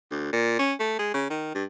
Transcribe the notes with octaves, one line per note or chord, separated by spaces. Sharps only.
D2
A#2
C#4
A3
G#3
C#3
D#3
G2